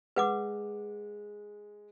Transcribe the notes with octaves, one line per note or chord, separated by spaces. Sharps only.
G#3 B4 F#5 D6